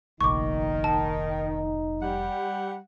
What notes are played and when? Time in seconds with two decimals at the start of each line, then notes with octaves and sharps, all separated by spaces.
0.21 F1 A#1 D#3 D#4 C#6 D6
0.84 A5
2.02 G3 F#5